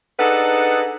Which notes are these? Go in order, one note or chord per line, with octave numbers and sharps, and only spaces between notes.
D4 D#4 G#4 A4 B4 F#5